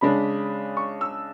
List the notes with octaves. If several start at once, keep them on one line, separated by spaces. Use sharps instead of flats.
C#3 G#3 D4 B5
C#6
E6